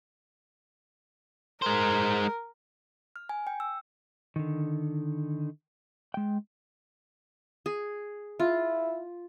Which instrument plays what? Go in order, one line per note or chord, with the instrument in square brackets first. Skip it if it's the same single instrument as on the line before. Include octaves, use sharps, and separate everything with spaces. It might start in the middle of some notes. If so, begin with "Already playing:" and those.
[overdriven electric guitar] G#3 C5 [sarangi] A#4
[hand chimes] F6
G#5
G5
E6
[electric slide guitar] D3 D#3
G#3 G5
[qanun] G#4
[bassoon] E4 [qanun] F4